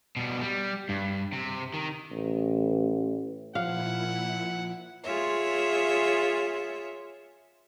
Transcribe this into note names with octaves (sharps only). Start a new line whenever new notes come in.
B2 G3
G3
G2
C3
D#3
A1
A#2 F3 E4 F5 F#5
F4 G#4 C#5 E5